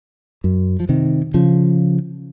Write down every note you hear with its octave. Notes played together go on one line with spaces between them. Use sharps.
F#2
F3
C3 D#3
C#3 F3